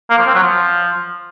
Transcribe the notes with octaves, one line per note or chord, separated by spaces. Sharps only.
A#3
F3
C4
F#3
F3